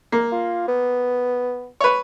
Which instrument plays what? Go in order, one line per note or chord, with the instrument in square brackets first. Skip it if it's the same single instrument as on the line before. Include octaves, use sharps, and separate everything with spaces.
[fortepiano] A#3
[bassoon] F4
B3
[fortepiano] B4 C#5